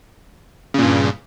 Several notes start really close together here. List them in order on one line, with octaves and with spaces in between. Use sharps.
C#3 A#2 G2